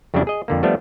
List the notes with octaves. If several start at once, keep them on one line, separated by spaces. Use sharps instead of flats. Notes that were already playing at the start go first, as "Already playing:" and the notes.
F2 C#3 F#3 G3 D4 E4
G#4 D#5
F2 D3 A#3
F3 G3 A3 B3 D4